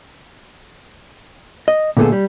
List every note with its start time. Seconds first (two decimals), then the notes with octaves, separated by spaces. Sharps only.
1.68 D#5
1.97 A#2 D3 A3 B3 G#4 A4
2.12 G3